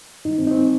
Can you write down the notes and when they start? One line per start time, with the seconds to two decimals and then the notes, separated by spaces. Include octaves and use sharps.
0.25 G2 D#3 G3 D#4
0.38 C4
0.47 D#4
0.51 C4